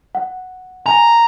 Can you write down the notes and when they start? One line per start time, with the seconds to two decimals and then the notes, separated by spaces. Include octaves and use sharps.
0.15 F#5
0.86 G#5 A#5